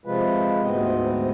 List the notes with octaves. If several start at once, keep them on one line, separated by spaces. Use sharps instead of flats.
C3 F3 G#3 F4 B4
D2 G#2 C3 B3 C4 D#5